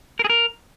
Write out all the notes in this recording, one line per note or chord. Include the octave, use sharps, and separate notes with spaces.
A#4
G#4
A#4